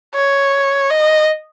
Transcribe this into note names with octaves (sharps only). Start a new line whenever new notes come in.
C#5
D#5